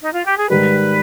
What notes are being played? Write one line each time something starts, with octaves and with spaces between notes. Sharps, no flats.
D#4
F4
G4
G#4
G#2 D#3 G3 B4